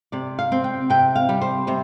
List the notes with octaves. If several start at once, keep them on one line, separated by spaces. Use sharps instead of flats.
C3 D5
F5
C4
G5
C3 G5
F5
G3
C5
C3 C5